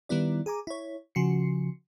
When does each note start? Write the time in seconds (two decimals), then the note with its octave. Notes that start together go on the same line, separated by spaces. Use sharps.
0.09 D#3 G3 B3 E4 D5
0.46 G#4 G#5 A#5 D6
0.67 E4 C#5
1.15 C#3 F3 F#4 C7 C#7